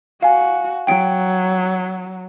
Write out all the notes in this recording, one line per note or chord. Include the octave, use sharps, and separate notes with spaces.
F#4 F5 G#5
F#3 G5 D7